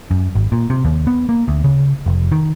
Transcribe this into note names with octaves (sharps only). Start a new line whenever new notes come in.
F#2
G#1
A#2
C3
D#2
B3
A#3
D2
C#3
F1
D#3